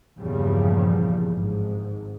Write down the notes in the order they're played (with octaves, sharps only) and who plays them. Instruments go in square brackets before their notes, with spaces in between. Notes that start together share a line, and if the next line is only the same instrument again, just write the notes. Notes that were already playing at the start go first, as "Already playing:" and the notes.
[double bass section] E2 G2 A#2 C#3 F3 G3
G#1 G#2